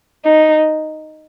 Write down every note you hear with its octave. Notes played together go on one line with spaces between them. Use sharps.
D#4